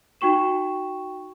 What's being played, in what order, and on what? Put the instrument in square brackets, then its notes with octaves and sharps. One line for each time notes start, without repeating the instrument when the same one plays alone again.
[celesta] D#4 F#4 G5 C#6 E7